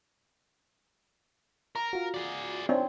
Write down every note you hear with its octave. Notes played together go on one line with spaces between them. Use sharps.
A#4 A#5
F4 F#4
G#4 D5
C4 D4 D#4 C#5 D5